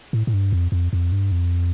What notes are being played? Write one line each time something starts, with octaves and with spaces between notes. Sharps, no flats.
A2
A2
G2
F2
F2
F2
G2
F2